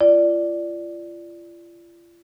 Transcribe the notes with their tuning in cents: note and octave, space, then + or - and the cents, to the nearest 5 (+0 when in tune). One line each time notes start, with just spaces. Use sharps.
F4 -35 D5 +0